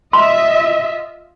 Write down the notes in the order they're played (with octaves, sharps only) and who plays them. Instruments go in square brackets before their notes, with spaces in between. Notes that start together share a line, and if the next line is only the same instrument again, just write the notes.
[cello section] F4 D#5 E5 [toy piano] C6